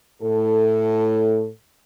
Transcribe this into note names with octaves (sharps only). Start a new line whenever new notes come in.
A2 A4